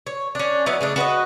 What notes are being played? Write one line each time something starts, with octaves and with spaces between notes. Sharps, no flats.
C#5
C#4 D4
F#3 B3 E4 D#5
C#3 A3 D4
F#4 B4 C#5 D#5